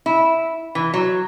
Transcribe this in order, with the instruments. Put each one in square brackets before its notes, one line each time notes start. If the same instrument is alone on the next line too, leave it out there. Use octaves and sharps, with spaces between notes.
[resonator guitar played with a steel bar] E4
E3
F#3